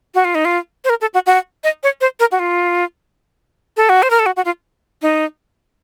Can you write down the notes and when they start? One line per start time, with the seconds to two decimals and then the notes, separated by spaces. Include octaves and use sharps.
0.15 F#4
0.25 F4
0.35 D#4
0.45 F4
0.84 C5
0.90 A#4
1.01 A4
1.14 F#4
1.26 F#4
1.64 D#5
1.83 C#5
2.01 C5
2.20 A#4
2.32 F#4
2.39 F4
3.77 A4
3.89 F#4
4.03 C5
4.10 A#4
4.19 A4
4.26 F#4
4.36 F#4
4.45 F4
5.02 D#4